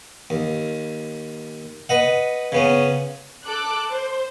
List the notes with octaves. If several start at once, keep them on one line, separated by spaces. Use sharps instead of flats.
D#2
B4 D#5 F#5
C#3 B3 C#4
A4 D6 F#6
C5